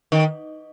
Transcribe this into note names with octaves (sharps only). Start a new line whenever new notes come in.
D#3